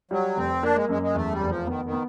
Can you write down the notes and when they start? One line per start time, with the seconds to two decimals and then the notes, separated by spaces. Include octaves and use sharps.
0.11 F#3 G3
0.37 F1 C4
0.63 A#3 D4
0.75 G#3
0.89 F#2 G#3
1.02 G#3
1.15 E2 A3
1.32 G3
1.41 F1
1.49 F3
1.67 D#3 B3
1.85 D#3
1.92 B3